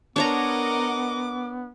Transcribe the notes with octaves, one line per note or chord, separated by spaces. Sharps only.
B3 D4 A#4 C#5 D#5 F#5 A#5 D6